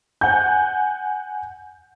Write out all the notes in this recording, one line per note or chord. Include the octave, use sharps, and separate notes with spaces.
F#5 G#5 G6